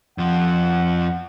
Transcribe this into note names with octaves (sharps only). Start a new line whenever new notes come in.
F2 F3 F#5